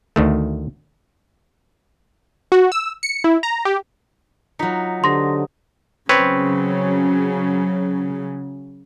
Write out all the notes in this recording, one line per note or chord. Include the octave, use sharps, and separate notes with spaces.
D2 D#3 A3
F#4
E6
C#7
E4
A#5
G4
F#3 D#4 F4 B6 C#7
D3 G4 C5 C6 D#6 A#6
C#3 F#3 C4 B4 C#5